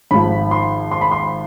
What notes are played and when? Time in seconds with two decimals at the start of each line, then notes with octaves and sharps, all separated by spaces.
0.11 G#1 G#2 F3 B5
0.51 C6
0.91 C6
1.01 B5
1.11 C6